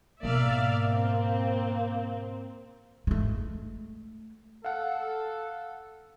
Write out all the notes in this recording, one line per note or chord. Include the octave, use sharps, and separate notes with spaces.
G#2 B2 A#3 D5 E5 F5
C4
G#3 A3
A4 F5 F#5